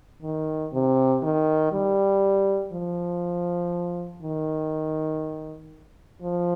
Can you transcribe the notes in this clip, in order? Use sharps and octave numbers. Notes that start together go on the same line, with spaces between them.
D#3
C3
D#3
G3
F3
D#3
F3